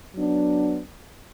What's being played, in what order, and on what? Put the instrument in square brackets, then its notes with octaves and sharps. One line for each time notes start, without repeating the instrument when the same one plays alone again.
[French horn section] F#3 B3 D4